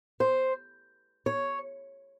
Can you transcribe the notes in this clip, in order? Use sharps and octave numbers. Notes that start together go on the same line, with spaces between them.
C5
C#5